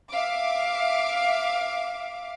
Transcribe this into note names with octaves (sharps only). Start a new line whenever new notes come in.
E5 F5 D6